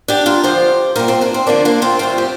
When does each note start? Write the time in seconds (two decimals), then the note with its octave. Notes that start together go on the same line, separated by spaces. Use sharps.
0.08 D4 G4
0.26 F4 A#4
0.43 F2 D3 F3 G4 C5
0.96 A#2 G3 F4 A#4
1.08 C4 F4
1.21 A#3 D4
1.34 C4
1.47 D2 D3 F3 A#3 D4
1.65 A#3 D4
1.82 C4 F4
1.99 D2 C3 G3 C4 F4
2.18 G4